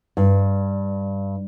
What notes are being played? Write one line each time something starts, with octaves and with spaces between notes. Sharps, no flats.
G2